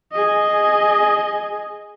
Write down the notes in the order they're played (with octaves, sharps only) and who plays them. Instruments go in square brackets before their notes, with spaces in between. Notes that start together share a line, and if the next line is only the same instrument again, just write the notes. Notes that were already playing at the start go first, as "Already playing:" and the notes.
[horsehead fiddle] G#4 D#5